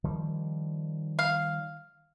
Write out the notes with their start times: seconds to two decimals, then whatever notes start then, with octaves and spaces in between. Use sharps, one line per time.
0.04 D#3 F3 G3
1.19 F5